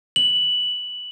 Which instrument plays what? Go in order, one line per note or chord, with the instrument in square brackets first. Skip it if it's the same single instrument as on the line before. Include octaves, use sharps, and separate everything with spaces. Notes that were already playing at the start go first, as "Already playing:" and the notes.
[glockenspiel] F#7